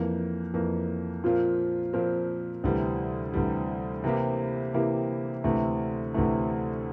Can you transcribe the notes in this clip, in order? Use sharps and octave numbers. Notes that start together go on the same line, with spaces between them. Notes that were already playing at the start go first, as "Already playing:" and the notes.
Already playing: F2 E3 A#3
F2 E3 A#3
A#2 F3 C4 F4 A#4
A#2 F3 C4 F4 A#4
D2 C3 E3 G3
D2 C3 E3 G3
C3 E3 A#3 E4 G4
C3 E3 A#3 E4 G4
D2 C3 E3 A3
D2 C3 E3 A3